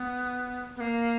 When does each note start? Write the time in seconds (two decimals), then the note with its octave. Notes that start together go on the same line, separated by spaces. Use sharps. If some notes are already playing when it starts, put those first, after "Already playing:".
Already playing: B3
0.76 B3
0.80 A#3